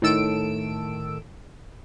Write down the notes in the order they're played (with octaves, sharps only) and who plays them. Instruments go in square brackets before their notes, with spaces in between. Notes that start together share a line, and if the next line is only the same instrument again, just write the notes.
[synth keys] A2 D#3 A4 E6 D7